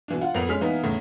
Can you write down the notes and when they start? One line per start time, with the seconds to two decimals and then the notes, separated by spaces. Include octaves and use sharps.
0.08 B2 E3 D4
0.21 F4 F#5
0.34 F2 A#2 B3 A#4 F7
0.49 G#3 C#4 F6 B6
0.61 E3 A#3 B3 D#4
0.83 E2 A2 C#3